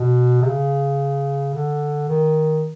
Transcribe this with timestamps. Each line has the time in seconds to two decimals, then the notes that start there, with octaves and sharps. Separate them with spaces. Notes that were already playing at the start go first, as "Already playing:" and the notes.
Already playing: B2
0.42 C3
0.46 C#3
1.54 D3
2.08 D#3